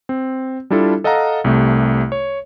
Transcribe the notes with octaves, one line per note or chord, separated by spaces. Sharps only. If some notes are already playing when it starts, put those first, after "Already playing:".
C4
G3 D4 E4 F4 A4
A4 D#5 F5 F#5 A#5
C2 C3 A3
C#5